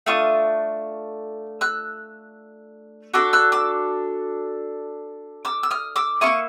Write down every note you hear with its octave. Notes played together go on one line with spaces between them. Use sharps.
A3 D4 F4 C#6 D#6
E6 F#6
D4 F#4 A4 D6 E6
E6 F#6
D6 E6
D6 E6
E6
D#6 F6
D6 E6
A#3 C#4 E4 C#6 D#6